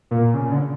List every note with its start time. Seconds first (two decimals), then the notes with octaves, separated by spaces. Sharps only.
0.11 A#2
0.34 C#3
0.52 D3